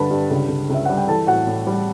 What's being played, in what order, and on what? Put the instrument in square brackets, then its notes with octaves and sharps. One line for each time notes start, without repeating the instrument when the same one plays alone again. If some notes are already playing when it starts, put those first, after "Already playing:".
Already playing: [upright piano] G2 D3 G3 A4 B4 A5 B5
G2
C#2
C#2
C#2 E5
G3 F#5
G5
E3 A4 A5
A2 F#4 F#5
A2
G3